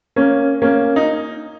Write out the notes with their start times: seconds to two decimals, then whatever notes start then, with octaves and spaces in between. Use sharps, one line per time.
0.16 A#3 C#4
0.62 A#3 C#4
0.96 D#4